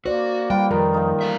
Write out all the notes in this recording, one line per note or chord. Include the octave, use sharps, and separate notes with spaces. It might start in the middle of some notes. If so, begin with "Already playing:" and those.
A#3 F#4 C5 D5
G3 F4 B4 G5
F2 D#3 A#4 A#5
A#3 D#4
E3 A3 E5